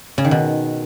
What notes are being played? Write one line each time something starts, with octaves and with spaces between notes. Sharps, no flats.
C#3
D#3
B2